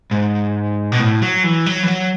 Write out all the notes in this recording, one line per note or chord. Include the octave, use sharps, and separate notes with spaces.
G#2
B2
A2
F#3
E3
F#3
E3
F#3